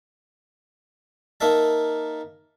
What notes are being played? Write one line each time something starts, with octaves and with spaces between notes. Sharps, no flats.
A#3 D#4 E5 A5